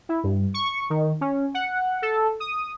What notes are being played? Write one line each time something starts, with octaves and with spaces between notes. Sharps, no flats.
E4
G2
C#6
D#3
C#4
F#5
A4
D#6